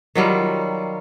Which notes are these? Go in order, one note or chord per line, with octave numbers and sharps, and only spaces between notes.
D#3 F#3 G3 F4